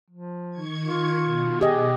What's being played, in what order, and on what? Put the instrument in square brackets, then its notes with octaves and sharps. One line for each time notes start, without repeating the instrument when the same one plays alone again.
[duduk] F3
[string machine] D#3 C#6 G#6
[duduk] F4
[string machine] B2
[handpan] G4 D#5 [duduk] G#4